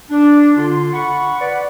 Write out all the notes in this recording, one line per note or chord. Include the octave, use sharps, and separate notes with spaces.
D4
D3 F4 C6
F#5 B5 C#6
B4 D5 F#5